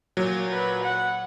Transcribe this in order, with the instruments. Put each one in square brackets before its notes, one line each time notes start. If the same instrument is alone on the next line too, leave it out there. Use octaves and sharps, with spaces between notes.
[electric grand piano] A#2 F#3
[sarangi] B4
F#5